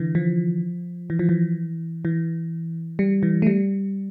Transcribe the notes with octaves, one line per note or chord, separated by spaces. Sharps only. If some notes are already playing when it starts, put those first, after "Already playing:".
Already playing: D3 E3
F3
E3
F3
E3
E3
G3
E3
A3
G3